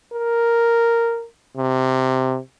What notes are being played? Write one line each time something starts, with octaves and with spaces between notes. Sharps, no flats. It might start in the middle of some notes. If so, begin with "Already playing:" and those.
A#4
C3